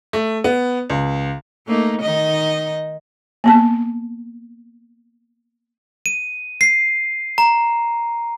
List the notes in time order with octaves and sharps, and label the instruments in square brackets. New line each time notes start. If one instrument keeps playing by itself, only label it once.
[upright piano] A3
B3
C#2
[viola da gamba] A3 A#3 D#4
D#3 D#4 D#5
[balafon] A#3 B3 A5
[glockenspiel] D#7
C7
A#5